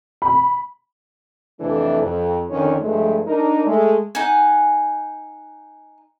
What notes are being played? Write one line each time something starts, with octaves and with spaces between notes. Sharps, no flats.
B5
F2 C3 E3 A3 D4 A4
F2
F2 D3 D#3 C#4 D4 C#5
G2 F3 G#3 A3
D4 D#4 A#4
G#3 A3
D#4 F#5 G#5